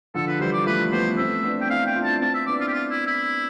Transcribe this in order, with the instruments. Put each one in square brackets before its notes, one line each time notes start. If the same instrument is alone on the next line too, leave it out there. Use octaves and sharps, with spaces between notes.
[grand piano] D3 F3 [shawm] A4
[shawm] B4
[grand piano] E3 G3 [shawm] C5
[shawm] D5
[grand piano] F3 A3 [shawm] B4
[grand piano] G3 B3 [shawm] C5
[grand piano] A3 C4 [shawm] E5
[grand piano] B3 D4
[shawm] G5
[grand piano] C4 E4 [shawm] F5
[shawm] G5
[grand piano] D4 F4
[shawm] A5
[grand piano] C4 E4 [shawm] A5
[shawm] E5
[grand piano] B3 D4 [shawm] D5
[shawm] F4
G4
F4
E4
E4